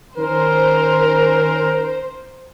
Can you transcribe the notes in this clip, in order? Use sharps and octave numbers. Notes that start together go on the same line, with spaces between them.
D#3 C#4 A#4 C5